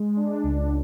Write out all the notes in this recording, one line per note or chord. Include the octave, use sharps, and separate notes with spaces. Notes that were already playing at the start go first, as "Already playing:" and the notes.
Already playing: G#3
D4
C#2